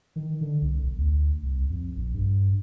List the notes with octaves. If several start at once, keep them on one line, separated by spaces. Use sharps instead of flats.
D#3
D3
C2
B1
D2
C2
F2
A#1
G2